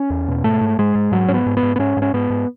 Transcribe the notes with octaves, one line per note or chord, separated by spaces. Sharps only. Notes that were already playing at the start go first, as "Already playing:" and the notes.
Already playing: C#4
E2
B2
G#2 A3
G#2
G#2 G#3
G#2
G#2 F#3
G#2 C#4
B3
G#2
B3
G#2
B3
G#2 C#4
G#2
C#4
G#2 B3
G#2